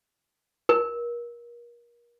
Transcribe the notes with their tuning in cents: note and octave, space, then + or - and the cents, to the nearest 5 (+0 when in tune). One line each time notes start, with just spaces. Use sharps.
A#4 +30